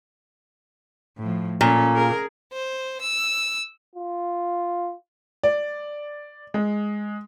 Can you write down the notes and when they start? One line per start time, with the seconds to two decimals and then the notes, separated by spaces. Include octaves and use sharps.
1.18 A2 F3
1.61 A#2 C#4 A4
1.95 G#4 A#4
2.53 C5
3.01 E6
3.95 F4
5.43 D5
6.54 G#3